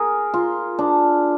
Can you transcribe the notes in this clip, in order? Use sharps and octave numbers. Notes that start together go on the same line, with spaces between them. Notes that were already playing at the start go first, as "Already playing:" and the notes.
Already playing: G#4 A#4
F4
D4